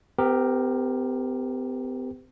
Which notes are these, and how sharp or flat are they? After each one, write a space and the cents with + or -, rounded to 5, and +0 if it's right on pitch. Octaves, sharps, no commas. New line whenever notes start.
C4 -45 G4 +15 A#4 +0